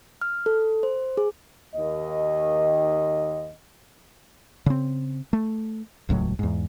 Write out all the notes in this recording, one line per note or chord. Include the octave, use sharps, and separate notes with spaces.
F6
A4
C5
G#4
D#2 D#3 D#5
C#3 C4
A3
D#1 C#2 A2 F#3
E2 G#2